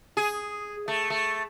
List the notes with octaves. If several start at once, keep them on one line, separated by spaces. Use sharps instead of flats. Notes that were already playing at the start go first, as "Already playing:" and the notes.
G#4
A3
A3